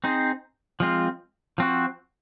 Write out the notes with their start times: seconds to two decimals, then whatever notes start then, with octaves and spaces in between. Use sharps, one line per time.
0.04 C4 D#4 G#4 C5
0.80 F3 G#3 C4 F4
1.58 F3 C4 F#4